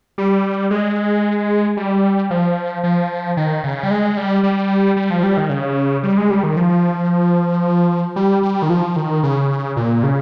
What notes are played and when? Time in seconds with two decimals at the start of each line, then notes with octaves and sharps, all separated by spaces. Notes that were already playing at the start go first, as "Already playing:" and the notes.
0.18 G3
0.71 G#3
1.77 G3
2.31 F3
2.84 F3
3.37 D#3
3.64 C#3
3.83 G3
3.91 G#3
4.17 G3
4.43 G3
4.97 G3
5.10 F3
5.23 G3
5.37 D#3
5.50 C#3
6.03 G3
6.17 G#3
6.30 G3
6.43 D#3
6.57 F3
8.16 G3
8.43 G3
8.62 D#3
8.70 F3
8.96 D#3
9.23 C#3
9.77 A#2
10.03 C#3